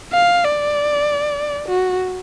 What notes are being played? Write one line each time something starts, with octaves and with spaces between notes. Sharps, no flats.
F5
D5
F#4